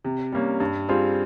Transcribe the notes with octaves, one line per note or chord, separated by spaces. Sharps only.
C3
G3 A#3 C#4
G2
G3 C4 F4 G#4